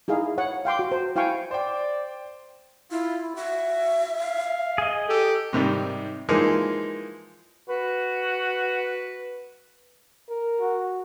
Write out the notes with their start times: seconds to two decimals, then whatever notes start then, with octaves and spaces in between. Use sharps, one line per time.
0.08 D#4 E4 G#4 F5
0.38 C#5 F#5
0.65 F5 G5 C6 D6
0.79 F#4
0.92 C5
1.16 E4 F5 G5 G#5 C#6
1.51 C5 D5 G5
2.91 E4 F4
3.36 F#4 E5
4.21 F5
4.78 G#4 D#5
5.08 G4 A4
5.53 G#2 C3 D#3 G3
6.29 E3 F3 G#3 A#3 D#4
7.69 F#4 B4
10.29 A#4
10.60 F#4